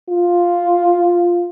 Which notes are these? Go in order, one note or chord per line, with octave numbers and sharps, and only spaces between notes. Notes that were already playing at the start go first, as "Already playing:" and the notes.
F4